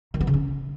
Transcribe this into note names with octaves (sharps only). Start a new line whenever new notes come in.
D#3
B3
C#3
C#4